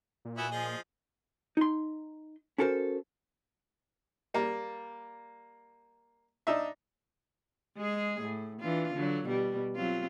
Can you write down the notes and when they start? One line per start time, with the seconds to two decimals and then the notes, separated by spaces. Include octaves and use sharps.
0.25 A#2
0.37 B3 E4 F#4 G#5
0.51 F3 G#4 D#5
1.57 D#4 C6
2.58 C#4 F#4 A4 A#4 C5
4.34 G3 A#3
6.47 D4 D#4 E5
7.77 G#3 G#4
8.21 A2
8.60 E3 D4 F4
8.94 D3 F#3
9.25 B2 G3
9.76 F#3 C4 F4